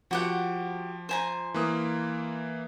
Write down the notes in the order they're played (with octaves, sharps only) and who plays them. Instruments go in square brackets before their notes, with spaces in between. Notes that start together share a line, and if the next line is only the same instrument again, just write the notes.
[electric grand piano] F3 [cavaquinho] F#4 G4 F#5
[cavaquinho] C5 G#5 A#5
[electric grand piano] E3 A#3 D#6